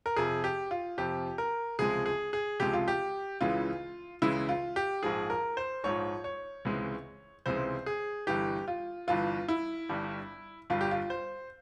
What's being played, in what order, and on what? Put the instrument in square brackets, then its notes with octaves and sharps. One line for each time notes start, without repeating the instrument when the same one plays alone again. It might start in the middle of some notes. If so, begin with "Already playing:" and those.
[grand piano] A#4
F2 C3 F3 G#4
G4
F4
F2 C3 F3 G4
A#4
C#2 C3 F3 G#3 G#4
G#4
G#4
C#2 C3 F3 G#3 G4
F4
G4
C#2 C#3 E3 G#3 F4
C#2 C#3 E3 G#3 E4
F4
G4
A#1 G#2 F3 G#4
A#4
C5
A#1 G#2 F3 C#5
C#5
C#2 C3 E3 G#3
C#2 C3 E3 G#3 C5
G#4
G1 G2 E3 G4
F4
G1 G2 E3 F4
E4
G1 G2 G3
G1 G2 G3 F4
G4
F4
C5